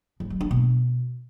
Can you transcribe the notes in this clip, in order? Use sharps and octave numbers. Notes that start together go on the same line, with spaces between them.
F3
F#3
D4
B2